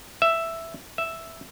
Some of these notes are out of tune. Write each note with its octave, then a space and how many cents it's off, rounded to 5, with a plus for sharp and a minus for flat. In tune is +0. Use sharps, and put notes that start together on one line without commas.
E5 +5
E5 +0